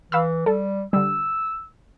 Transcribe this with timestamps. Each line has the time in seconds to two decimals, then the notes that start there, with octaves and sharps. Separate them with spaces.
0.12 E3 F5 B5 E6
0.46 G3 A4
0.93 D3 G3 E6